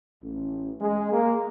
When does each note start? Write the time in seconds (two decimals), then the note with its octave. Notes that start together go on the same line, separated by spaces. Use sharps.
0.22 A1
0.80 G#3
1.12 A#3